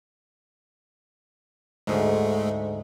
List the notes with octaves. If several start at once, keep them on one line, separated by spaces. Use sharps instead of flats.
D2 G#2 G#3 A3